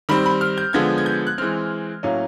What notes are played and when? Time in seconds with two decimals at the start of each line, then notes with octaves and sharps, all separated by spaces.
0.09 D#3 G3 C4 B5
0.26 B5
0.41 F6
0.58 G6
0.73 D3 F3 G#3 B3 G#6
0.98 G#6
1.06 G6
1.27 F#6
1.38 E3 G#3 C4 F6
2.03 A2 F#3 A#3 C#4